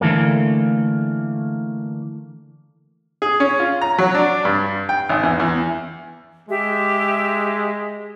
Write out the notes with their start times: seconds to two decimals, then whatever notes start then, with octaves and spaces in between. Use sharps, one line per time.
0.01 D3 E3 A3 A#3
3.22 G#4
3.40 C#4
3.60 F4
3.81 A#5
3.98 F#3
4.15 D4
4.45 G2
4.89 G5
5.09 G#1
5.23 E2
5.40 E2
6.49 G#3 G4 E5